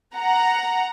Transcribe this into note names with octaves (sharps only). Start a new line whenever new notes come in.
F#5 A#5